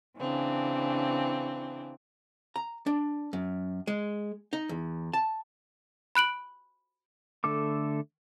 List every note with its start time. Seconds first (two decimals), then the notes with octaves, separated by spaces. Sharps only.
0.18 C#3 E3 C4 D4
2.56 A#5
2.86 D4
3.33 F#2
3.87 G#3
4.53 D#4
4.69 E2
5.13 A5
6.15 B5 F#6 D7 F#7
7.44 D3 A3 A4 D6